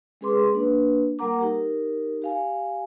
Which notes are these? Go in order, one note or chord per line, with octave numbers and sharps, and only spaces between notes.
G#3 C#4 G#4 B4 C6 D6
A#3 D4 B4
G3 A#3 A#4 F#5 A#5 D6
D#4 G4 A#4
G4 F5 G#5